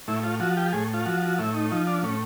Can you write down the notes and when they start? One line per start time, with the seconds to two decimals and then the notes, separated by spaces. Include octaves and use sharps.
0.08 A2 E4
0.24 F4
0.40 F3 F#4
0.57 G4
0.72 A2 G#4
0.94 F4
1.06 F3 F#4
1.23 F#4
1.38 A2 E4
1.54 D#4
1.71 F3 D#4
1.87 D4
2.03 A2 C#4